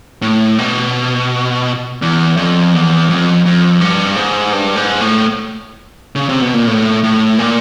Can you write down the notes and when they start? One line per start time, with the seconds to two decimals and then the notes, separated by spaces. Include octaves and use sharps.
0.22 A2
0.59 B2
2.02 E2
2.37 F2
2.73 E2
3.09 F2
3.45 F2
3.81 G2
4.16 G#2
4.53 G2
4.76 G#2
5.01 A2
6.15 C#3
6.29 C3
6.41 B2
6.54 A#2
6.67 A2
7.04 A2
7.39 A#2